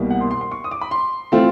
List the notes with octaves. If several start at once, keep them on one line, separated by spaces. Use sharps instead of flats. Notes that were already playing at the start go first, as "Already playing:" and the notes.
Already playing: C2 B2 G3 A#3
F#5
C6
C6
C6
C#6
D#6
D6
B5
C6
E3 A3 C4 F4